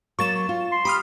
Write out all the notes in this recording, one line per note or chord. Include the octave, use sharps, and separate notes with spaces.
F#3 A#3 C#6 A6 E7
F4
C6
G4 B5 D#6 F6